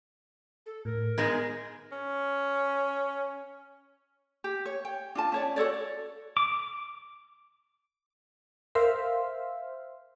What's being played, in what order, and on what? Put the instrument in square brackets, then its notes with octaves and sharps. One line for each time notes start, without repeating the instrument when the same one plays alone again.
[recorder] A4
[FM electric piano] A2 [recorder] A#4
[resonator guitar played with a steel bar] G#2 G#3 D#4 [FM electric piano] B3 G#6
[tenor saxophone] C#4
[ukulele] G4
C#5
G5
D4 F4 A5
C#4 C#5 D5
F#4 A4 C#5 D5
[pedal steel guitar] D6
[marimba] A#4 [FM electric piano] C5 E5 F5